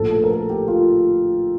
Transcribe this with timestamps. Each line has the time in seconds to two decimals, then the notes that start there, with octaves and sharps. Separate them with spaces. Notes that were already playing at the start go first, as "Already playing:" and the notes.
Already playing: A#1 A2 F3 A4
0.11 A4
0.24 A#4
0.31 A4
0.50 G4
0.68 F4